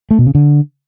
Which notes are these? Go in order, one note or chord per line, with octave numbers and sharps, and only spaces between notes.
A3
B2
C#3
D3